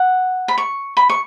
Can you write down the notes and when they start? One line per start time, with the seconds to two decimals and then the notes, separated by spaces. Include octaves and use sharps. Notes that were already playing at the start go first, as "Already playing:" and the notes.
Already playing: F#5
0.48 B5
0.58 C#6
0.97 B5
1.09 C#6